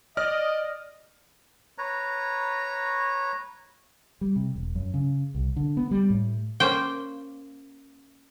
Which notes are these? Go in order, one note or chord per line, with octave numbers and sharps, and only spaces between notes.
D5 D#5 F6
B4 C#5 A#5
G3
C3
E1
F#2
C#3
C2
D3
B3
G3
A2
A#3 C#4 C5 G5